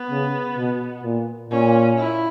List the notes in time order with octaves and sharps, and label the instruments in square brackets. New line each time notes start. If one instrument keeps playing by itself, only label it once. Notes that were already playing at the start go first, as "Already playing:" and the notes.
Already playing: [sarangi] B3
[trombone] C#3
B2
A#2
[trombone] A#2 [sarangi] C#4
[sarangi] E4